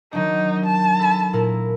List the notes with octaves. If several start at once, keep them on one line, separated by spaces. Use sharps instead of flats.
D#3 F#3 D4 D#4
A5
A4 B5
A#2 E4 A#4